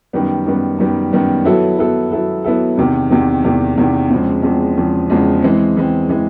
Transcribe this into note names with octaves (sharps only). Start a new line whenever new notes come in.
F#2 D#3 G3 B3
F#2 D#3 G3 B3
F#2 D#3 G3 B3
F#2 D#3 G3 B3
F#3 B3 E4 A4
F#3 B3 E4 A4
F#3 B3 E4 A4
F#3 B3 E4 A4
E2 C3 D#3
E2 C3 D#3
E2 C3 D#3
E2 C3 D#3
E2 C#3 F3 G#3 C4
E2 C#3 F3 G#3 C4
E2 C#3 F3 G#3 C4
E2 C#3 F3 G#3 C4
E3 G#3 C4
E3 G#3 C4
E3 G#3 C4